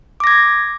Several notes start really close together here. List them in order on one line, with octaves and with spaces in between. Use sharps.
D6 A#6 G#6